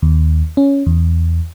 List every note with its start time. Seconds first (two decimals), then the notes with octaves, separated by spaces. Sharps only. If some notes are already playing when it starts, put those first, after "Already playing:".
0.02 D#2
0.57 C#4
0.86 E2